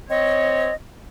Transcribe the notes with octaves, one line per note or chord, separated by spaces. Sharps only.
C4 C#5 D#5